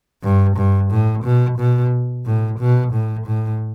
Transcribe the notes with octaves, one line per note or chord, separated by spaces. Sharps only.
G2
G2
A2
B2
B2
A2
B2
A2
A2